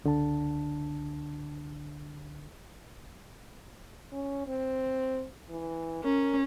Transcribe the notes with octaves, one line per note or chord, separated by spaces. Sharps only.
C#2 D3 D4 A5
C#4
C4
E3
C#4 A#4